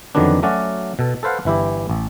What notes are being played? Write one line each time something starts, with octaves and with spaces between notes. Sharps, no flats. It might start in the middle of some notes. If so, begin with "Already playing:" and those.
F2 D3 D#3 F#3 B3 D4
F#3 A3 C#4 F#4 D5
B2 A4
A4 B4 C5 F5 F#5
G1 E3 E4 G4
A1